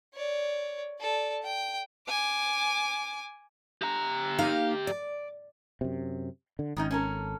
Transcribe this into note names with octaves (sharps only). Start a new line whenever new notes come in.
C#5 D5
A4 D5
G5
G#5 D6
G4 A#5
A#3 D#4 F5
D5
F#2 C3
D3
G#1 D#3 C#4 D#4
C#4 A4 A#4